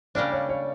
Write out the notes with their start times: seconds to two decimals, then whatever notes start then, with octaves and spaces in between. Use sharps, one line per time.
0.15 C#3 G3 A#3 D4 D5
0.32 C#5
0.49 C#5